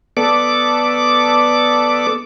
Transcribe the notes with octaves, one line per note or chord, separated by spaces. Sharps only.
B3 A4 D5 D6